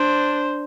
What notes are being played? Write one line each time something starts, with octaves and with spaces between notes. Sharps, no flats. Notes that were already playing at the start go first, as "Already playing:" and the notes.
Already playing: D4 C5